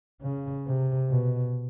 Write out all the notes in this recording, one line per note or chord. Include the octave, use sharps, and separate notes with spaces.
C#3
C3
B2